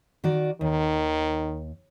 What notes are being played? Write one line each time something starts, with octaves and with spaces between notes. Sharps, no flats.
D#3 F#4 D5
D#2 D#3